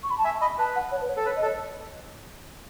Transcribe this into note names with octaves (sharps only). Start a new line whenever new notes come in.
C#6
B5
A5
E5 G#5
D#5 B5
B4 A5
F#5
C#5
B4
C#5
A4
B4 C#5
D#5
A4
C#5